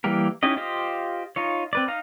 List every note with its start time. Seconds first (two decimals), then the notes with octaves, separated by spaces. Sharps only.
0.04 E3 G3 A#3 G4 A#4
0.43 C#4 D#4 E4 G4 D#5
0.56 F4 G4 C5 D#5 F5
1.36 D#4 F4 C#5
1.73 C4 B4 D5
1.88 D#4 F5 A#5